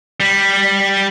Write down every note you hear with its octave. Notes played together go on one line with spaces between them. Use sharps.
G3